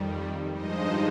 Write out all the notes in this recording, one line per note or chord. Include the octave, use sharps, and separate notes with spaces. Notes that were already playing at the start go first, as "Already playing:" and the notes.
Already playing: F2 D#3 G3
G2 F3 G#3 D#4 C5 D#5